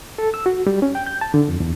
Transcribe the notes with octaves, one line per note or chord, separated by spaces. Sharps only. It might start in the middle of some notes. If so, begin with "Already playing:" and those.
A4
E6
F#4
G3
C#4
G5
G6
A5
D3
F2
E2